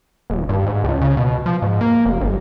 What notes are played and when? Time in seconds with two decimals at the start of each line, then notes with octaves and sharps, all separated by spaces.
0.30 D#1
0.49 G2
0.66 G#2
0.84 C#2
1.01 C#3
1.17 B2
1.46 F3
1.62 G#2
1.81 A#3
2.05 F1
2.21 G1